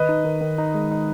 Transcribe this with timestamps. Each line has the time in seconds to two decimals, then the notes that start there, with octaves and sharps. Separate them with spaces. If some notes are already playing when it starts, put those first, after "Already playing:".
Already playing: D#3 B4 D#5
0.09 D#4
0.24 D#3
0.41 D#3
0.58 D#4
0.74 G#3
0.92 D#4